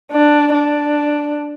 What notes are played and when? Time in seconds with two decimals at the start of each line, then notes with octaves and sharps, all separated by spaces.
0.12 D4
0.54 D4